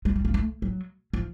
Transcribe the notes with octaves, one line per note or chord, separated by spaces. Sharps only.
G#3
G3
A#3
A3
F#3
F3